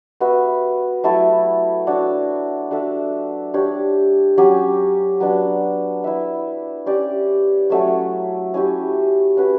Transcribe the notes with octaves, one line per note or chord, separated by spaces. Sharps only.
B3 F#4 B4 E5
F#3 A3 E4 A4
D4 F#4 C#5
D4 F#4 A4 E5
D4 G4 C#5
F#3 C#4 G4
F#3 B3 D4
E4 B4 E5
C#4 G4 D5
F#3 A3 C#4
C#4 E4 G4
C#4 F#4 B4